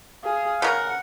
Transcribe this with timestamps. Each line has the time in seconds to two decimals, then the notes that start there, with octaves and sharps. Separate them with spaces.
0.24 G#4 F5
0.62 C#3 A#4 F#5